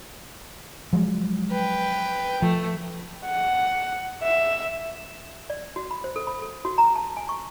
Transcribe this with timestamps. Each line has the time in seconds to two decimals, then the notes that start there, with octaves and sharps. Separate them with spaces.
0.93 F3 F#3 G#3
1.51 B4 G5
2.42 F3 A3
3.25 F#5
4.23 E5
5.50 D5
5.76 F#4
5.91 B5
6.04 C5
6.16 A4
6.27 B5
6.42 A4
6.65 F#4
6.78 A#5
6.96 A5
7.17 G#5
7.29 C#6